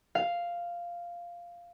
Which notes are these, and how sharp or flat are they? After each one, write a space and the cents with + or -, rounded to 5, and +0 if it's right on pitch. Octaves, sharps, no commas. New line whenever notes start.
F5 -5